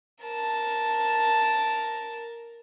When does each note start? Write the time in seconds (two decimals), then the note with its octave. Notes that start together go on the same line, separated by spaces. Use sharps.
0.24 A#4 A5